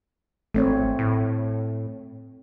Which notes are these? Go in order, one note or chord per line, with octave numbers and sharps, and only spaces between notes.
G#1 A3 C4 C#5
A2